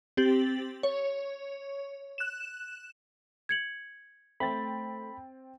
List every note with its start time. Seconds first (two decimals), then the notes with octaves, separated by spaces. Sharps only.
0.17 C4 G4 A6 F#7
0.83 C#5
2.18 F#6 E7
3.49 G#6 C#7 F#7
4.40 A3 C4 G5 B5 A6